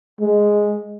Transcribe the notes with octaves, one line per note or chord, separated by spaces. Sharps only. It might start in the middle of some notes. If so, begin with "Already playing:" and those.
G#3